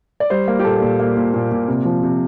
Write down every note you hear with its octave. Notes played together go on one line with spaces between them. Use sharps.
D5
G3 C5
A#3
G4
A#2 A4
A#2
A#3
A#2
A#2
A#2
C3
F3
C3